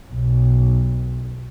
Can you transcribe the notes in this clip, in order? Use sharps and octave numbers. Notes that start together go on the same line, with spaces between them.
B1